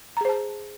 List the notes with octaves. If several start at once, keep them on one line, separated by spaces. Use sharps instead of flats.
G#4 C5 A5 A#5